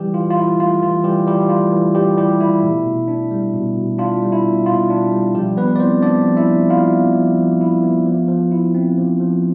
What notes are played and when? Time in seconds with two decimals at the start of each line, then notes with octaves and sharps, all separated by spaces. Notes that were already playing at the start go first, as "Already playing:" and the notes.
Already playing: E3 G3 G4
0.14 E3 F4
0.31 F4
0.37 E4
0.60 A3 F4
0.81 E3 F4
1.04 E3 G3 G4
1.27 G3 E4 G4
1.49 A3 F4
1.72 E3
1.95 E3 G3 G4
2.17 G3 E4 G4
2.40 A3 E4
2.63 B2
2.86 B2
3.08 D4
3.31 G3
3.54 B2
3.76 B2
3.98 D4 F4
4.22 G3
4.32 E4
4.45 B2
4.66 B2 F4
4.90 D4
5.12 G3
5.35 F3 G3 G4
5.57 F3 B3 B4
5.76 D5
5.80 C4 E4 C5
6.02 B3 D4 D5
6.25 F3
6.37 E4 E5
6.48 F3
6.70 E4 F4 F5
6.93 B3
7.16 F3
7.38 F3
7.61 E4
7.84 B3
8.05 F3
8.28 F3
8.51 E4
8.75 C4
8.97 F3
9.20 F3